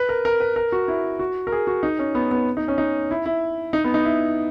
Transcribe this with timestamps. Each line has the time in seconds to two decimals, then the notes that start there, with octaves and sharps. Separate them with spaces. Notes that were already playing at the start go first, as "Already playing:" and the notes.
Already playing: B4
0.09 A#4
0.25 A#4
0.40 B4
0.56 A#4
0.72 F#4
0.88 E4
1.19 F#4
1.47 A#4
1.52 G#4
1.67 F#4
1.83 D#4
1.99 C#4
2.15 B3
2.31 B3
2.57 D#4
2.68 C#4
2.78 D#4
3.11 E4
3.26 E4
3.73 D#4
3.84 B3
3.94 D#4
4.05 E4